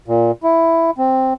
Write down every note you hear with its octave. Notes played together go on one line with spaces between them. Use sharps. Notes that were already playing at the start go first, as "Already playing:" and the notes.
A#2
E4
C4